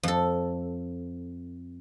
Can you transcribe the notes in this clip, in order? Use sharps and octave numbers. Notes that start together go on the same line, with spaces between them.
F2 A4